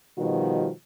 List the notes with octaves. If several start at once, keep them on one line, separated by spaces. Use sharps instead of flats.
B2 D#3 F3 G3 F#4